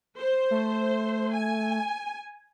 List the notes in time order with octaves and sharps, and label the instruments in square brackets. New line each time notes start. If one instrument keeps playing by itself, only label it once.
[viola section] C5
[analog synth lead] A3
[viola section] G#5